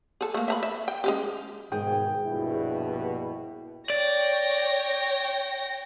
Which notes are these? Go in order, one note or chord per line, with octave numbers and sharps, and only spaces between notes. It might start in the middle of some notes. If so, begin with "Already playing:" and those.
G#4 A4
A3 A#3
E5 A#5 B5
E5
G5
G#3 C#4 G4
G#2 B2 D#3 G#4 G5
A#1 G2 B2 E4
C#5 D5 G5 A#6